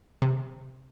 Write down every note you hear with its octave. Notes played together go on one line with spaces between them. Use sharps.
C3